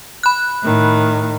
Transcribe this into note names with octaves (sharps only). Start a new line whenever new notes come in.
B5 F#6
A2 D#3